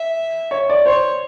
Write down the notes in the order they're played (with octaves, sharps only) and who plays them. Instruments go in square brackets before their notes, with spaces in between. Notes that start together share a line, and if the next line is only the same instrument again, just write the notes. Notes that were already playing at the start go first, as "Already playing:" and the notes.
Already playing: [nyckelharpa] E5
[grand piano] C#5
D5
[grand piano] C5 [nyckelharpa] C#5